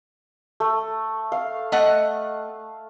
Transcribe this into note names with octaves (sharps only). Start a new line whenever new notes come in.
A3
F5
A3 D#5 F#5